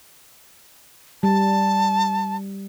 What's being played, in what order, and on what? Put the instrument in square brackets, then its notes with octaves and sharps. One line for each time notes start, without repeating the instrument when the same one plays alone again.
[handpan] G3 [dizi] A5